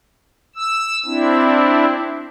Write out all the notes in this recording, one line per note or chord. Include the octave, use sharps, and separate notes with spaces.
E6
C4 D4 E4